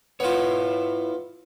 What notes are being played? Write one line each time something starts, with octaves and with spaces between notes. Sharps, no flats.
B3 E4 F4 C#5